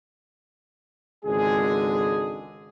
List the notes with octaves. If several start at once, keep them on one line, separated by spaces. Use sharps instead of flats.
G#1 C#2 D3 G#3 G#4